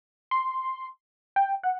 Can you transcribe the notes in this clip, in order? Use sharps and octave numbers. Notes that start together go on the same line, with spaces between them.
C6
G5
F#5